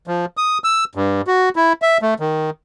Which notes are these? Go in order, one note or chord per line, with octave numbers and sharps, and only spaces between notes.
F3
D#6
E6
G2
F#4
E4
E5
A3
D#3